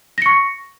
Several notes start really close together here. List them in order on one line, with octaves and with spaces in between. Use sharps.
A#6 C#7 C#6